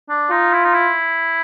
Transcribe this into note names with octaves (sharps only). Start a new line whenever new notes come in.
D4
D#4 F4
E4
D#4
E4